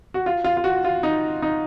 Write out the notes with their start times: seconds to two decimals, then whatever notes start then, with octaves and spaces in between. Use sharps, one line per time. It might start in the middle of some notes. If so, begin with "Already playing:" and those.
0.14 F#4
0.26 F4
0.44 F4
0.57 F4
0.64 F#4
0.84 F4
1.03 D#4
1.42 D#4